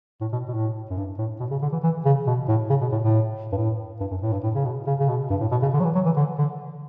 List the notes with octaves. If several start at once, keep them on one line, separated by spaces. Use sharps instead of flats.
A2
B2
B2
A2
F#2
G2
A2
B2
C#3
D3
E3
E3
C#3
B2
A2
C#3
B2
A2
A2
G2
A2
G2
F#2
A2
G2
A2
C#3
B2
C#3
C#3
B2
G2
A2
B2
C#3
D3
F#3
E3
F#3
E3
D3
D3